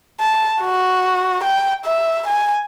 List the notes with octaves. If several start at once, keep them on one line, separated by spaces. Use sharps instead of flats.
A5
F#4
G5
E5
G#5